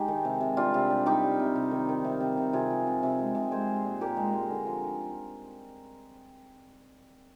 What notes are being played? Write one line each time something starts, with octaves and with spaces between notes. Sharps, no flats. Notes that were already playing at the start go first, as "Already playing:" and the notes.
Already playing: G#3 D#4 G4
D#3
C3
C3
G3 D4 F4
C3
G3
G3 D#4 G4
G3
C3
C3
D#3
D#3
C3
C3
C3
C3 F4 G#4
F3
C3
C3
G#3
C3
G#3 G#4 C5
G#3
A#2
A#2 G4 A#4
G#3
G#3
D3
F3